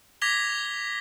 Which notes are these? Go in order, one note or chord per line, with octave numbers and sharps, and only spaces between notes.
D6 G#6 A#6 B6 F7 G7